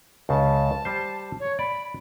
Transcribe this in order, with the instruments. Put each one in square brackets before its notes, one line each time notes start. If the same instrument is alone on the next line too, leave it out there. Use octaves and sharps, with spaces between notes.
[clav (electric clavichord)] C#2 C#3 [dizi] A5
[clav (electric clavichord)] G3 C5
[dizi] C#5
[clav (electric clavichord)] D5 [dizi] B5